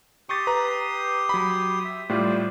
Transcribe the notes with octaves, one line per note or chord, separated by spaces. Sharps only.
G4 C6 C#6 D#6 A6
B4 A#5
F#3 B5
E5
A2 G3 F4 C5 D5